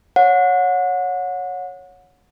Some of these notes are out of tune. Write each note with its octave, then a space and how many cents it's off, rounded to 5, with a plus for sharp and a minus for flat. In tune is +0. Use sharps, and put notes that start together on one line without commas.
C#5 +0 F#5 -30